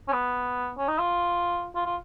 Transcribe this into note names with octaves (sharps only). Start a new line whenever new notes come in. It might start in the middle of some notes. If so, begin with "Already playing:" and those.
C#4
B3
C#4
D#4
F4
F4
F4